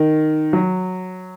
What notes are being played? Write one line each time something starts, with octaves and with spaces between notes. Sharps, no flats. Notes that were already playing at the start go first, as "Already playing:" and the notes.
Already playing: D#3
F#3